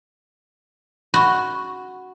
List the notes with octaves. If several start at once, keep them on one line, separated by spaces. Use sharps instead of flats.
F#4 B5 C#6